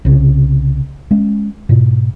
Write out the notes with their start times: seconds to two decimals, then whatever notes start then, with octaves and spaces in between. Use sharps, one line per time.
0.05 C2 C#3
1.11 G#3 C#4
1.69 G#2 B2